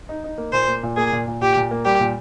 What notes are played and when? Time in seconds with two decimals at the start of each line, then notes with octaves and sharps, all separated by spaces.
0.09 D#4
0.24 D#4
0.38 A#3
0.53 A#2 C5
0.68 A#3
0.83 A#2
0.97 A#3 G#4
1.12 A#2
1.27 A#2
1.41 A#2 G4
1.56 A#2
1.71 A#3
1.85 G3 G4
2.00 A#2